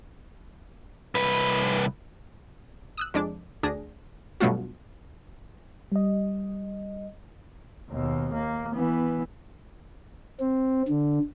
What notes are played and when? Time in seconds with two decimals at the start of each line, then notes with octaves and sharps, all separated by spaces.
1.15 C2 B4
2.97 D#6 E6 F#6
3.14 F2 G#3 D4 D6
3.63 D2 D4 G#4 A#6
4.40 G2 B2 F#3 A3 F4 F#4
5.92 G3 D#5
7.90 D#2 B2
8.33 A#3
8.75 E3 B3
10.40 C4
10.88 D3